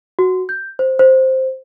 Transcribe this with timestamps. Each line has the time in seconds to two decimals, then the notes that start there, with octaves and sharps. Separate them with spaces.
0.19 F#4
0.49 G6
0.79 C5
0.99 C5